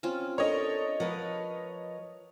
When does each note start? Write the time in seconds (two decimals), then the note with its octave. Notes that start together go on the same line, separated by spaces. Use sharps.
0.03 C4 C#4 F4
0.38 D4 A4 A#4 C#5 D#5
1.00 F3 A#4 B4 F#5